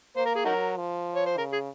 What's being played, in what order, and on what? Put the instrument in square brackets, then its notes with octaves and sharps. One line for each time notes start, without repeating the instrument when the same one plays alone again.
[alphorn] A#3 [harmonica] C5
[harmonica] A#4
G#4
[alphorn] F#3 [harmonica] D#4 F#4 A#4
[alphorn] F3
[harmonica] C#5
C5
[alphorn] C#3 [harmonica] A#4
[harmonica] G#4